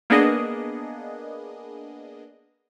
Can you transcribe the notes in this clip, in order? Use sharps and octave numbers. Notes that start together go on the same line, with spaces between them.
A#3 B3 D4 G#4 D#5